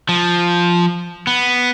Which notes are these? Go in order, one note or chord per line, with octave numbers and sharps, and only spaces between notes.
F3
B3